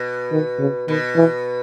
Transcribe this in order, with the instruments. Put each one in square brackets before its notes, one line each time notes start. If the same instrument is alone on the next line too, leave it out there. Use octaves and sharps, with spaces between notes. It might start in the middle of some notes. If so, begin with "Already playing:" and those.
Already playing: [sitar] B2
[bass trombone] D#3
C#3
[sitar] B2 [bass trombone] D#3
[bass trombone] E3